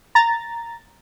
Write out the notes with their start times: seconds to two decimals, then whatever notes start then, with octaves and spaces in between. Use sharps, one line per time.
0.15 A#5 A6